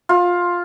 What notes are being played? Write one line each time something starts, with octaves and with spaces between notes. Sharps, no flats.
F4